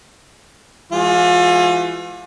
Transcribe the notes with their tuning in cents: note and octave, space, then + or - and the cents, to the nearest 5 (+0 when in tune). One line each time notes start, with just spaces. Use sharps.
E3 +35 G#3 +0 F4 +40